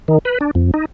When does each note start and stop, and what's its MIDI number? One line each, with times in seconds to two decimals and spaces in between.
0.08 0.18 51
0.25 0.38 71
0.41 0.51 62
0.55 0.71 41
0.74 0.85 63